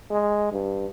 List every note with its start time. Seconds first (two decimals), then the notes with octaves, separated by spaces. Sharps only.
0.11 G#3
0.52 G2